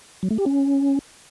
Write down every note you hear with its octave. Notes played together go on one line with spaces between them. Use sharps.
F#3
A3
G4
C#4